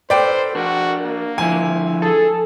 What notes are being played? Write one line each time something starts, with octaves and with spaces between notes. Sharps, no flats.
A4 B4 C5 D5 G5
D4 F#4 A#4
A#3
D3 F3 E4 G#5
G#4 A4